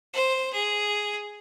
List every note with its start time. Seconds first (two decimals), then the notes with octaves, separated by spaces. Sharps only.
0.13 C5
0.53 G#4